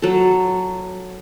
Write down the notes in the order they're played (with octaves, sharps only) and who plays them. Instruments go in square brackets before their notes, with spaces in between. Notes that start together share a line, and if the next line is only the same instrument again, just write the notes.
[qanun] F#3 A4